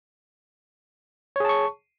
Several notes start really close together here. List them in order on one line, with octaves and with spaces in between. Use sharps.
C#5 G#4 A5 C#6